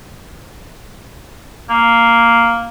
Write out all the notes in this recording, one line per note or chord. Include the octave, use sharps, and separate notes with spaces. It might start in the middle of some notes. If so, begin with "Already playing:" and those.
A#3